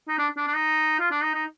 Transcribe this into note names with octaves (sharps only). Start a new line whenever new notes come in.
D#4
D4
D4
D4
D#4
F4
D4
D#4
D#4